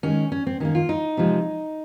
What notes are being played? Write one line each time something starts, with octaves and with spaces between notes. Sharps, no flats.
D#3 G#3 C#4
C#4
C4
D#3 G3 A#3 C#4
F4
D#4
C3 F3 G#3